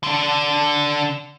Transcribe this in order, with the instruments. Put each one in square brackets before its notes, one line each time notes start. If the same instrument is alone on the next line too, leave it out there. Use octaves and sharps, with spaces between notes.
[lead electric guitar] D3 D4